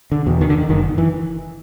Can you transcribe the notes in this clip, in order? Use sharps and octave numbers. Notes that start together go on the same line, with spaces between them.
D3
E2 B2
D#3
D3
D#3
F#1 D#3
E3